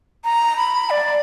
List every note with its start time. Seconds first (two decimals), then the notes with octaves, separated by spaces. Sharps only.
0.24 A#5
0.57 B5
0.90 D5